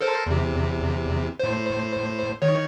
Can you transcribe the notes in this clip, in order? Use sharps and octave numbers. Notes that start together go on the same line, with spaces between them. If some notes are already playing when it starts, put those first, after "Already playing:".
A4 A#4 C5
E2 C3
A2 C5
D#3 C#5